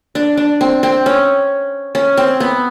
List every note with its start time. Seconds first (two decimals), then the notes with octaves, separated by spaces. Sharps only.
0.15 D4
0.37 D4
0.61 C4
0.83 C4
1.06 C#4
1.95 C#4
2.17 C4
2.40 B3